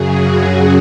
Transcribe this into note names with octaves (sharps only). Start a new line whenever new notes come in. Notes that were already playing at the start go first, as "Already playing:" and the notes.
Already playing: F#2 C#3 F#3 G#4
F#4